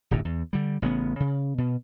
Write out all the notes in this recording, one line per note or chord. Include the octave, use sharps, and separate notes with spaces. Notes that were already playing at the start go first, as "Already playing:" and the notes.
D1 G1 F#2 A2
E2
D3 G3
A1 C#3 E3 B3
C#3
B2